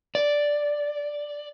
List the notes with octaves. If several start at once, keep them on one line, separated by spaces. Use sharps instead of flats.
D5